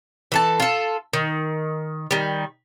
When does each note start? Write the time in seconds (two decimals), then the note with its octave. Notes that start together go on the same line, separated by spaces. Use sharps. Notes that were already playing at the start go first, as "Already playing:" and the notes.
0.32 E3 A4 A5
0.60 F4 A4
1.13 D#3
2.11 D#3 G3